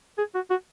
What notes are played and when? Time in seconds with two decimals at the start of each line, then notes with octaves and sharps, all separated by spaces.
0.18 G#4
0.35 F#4
0.50 F#4